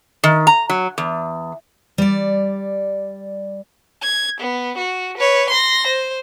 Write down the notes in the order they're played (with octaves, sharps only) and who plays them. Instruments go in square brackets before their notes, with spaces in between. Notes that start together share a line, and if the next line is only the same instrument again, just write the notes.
[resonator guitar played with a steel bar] D#3
A#5
F#3
E2
[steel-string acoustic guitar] G3 D5
[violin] G#6
B3
F#4
B4 C#5
C6 A#6
C5